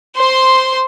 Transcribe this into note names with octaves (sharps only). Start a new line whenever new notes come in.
C5 C6